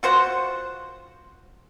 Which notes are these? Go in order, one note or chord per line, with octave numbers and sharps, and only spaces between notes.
F4 F#4 C5 F#5